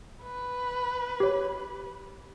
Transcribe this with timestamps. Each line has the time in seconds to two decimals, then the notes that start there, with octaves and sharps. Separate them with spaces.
0.24 B4
1.20 G4 C#5